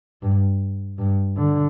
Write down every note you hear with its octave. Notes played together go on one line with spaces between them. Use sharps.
G2
G2
D3